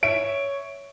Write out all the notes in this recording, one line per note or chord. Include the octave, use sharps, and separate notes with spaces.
C#5 E5 D7